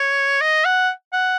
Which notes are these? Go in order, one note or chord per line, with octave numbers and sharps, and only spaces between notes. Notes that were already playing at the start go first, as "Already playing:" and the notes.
Already playing: C#5
D#5
F#5
F#5